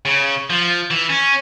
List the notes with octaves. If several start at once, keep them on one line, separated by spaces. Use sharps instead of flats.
C#3
F3
E3
C#4